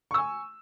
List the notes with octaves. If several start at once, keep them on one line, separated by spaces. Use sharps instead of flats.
G#5 C#6 E6